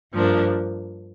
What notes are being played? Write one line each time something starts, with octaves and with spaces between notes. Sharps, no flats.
G2 F3 A#3 D4